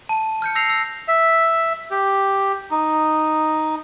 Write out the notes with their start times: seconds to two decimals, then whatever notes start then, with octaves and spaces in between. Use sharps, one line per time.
0.09 A5 D#7
0.42 F6 G6 C#7
0.55 E6 A#6 C7 F7
0.70 E6
1.08 E5
1.91 G4
2.71 D#4